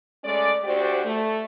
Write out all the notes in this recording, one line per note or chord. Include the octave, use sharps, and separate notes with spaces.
G#3 A3 C#4 D5
D2 F#4 G4 C5 D5
A3